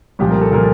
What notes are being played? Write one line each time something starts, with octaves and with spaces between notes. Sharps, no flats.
C2 A#2 F3 G4
A#4
A4
A#2 F3 A#4